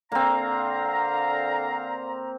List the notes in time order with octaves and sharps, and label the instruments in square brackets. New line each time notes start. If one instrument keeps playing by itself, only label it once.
[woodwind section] D3 F5 A#5 [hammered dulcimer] A#3 C4